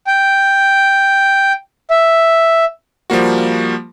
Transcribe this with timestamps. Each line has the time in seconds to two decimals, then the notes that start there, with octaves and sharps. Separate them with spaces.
0.07 G5
1.90 E5
3.10 F3 G3 A#3 F#4